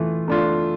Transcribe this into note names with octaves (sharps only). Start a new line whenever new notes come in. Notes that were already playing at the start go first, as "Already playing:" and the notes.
Already playing: E3 A3 F4
A3 D4 F4